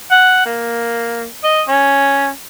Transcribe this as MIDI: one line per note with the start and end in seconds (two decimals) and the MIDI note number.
0.11 0.42 78
0.46 1.25 58
1.44 1.63 75
1.68 2.29 61